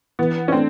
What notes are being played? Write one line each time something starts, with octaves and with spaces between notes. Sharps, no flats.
E3 B3
C#4
A3 C4 D4